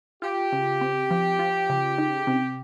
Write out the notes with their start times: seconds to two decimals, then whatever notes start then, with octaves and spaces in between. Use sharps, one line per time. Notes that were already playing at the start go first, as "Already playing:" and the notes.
0.22 F4 G4
0.52 C#3
0.81 C4
1.10 F3
1.39 F4
1.69 C#3
1.98 D#4
2.27 C3